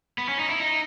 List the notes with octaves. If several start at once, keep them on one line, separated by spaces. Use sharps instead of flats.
B3
C#4
D#4
E4
D#4